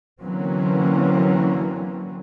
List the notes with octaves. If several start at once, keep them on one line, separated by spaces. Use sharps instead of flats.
D3 E3 F#3 A#3 C4 C#4